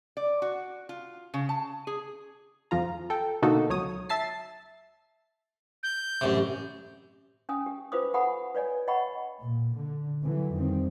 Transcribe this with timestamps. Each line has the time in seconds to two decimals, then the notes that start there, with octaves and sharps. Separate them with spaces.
0.17 D5
0.42 F#4
0.89 F4
1.34 C#3
1.49 A5
1.87 G#4
2.71 F2 F3 F4 A#5
3.10 A4 G5
3.42 B2 D3 A#3 D#4 F#4 A4
3.69 C#2 F#3 C#5 D#6
4.09 E5 A5 A6 C7
5.83 G6
6.21 A1 F#2 C3
7.49 C#4 G#5 D#6
7.66 G4
7.92 F4 B4 C5 D6 D#6
8.14 G4 A4 F#5 G#5 B5 D#6
8.55 B4 C#5 D5 G#5
8.88 D#5 F#5 G5 B5 C#6
9.42 A#2
9.76 D3
10.22 D3 E3 F#3
10.52 F2 D#3 G3 C4